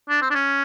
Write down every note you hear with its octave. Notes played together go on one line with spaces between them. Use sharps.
D4
C4
D4
C#4